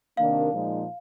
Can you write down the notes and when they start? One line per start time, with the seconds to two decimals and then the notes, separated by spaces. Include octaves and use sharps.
0.17 C3 D#3 A#3 D4 F5
0.51 A#2 F3 G#3 D#4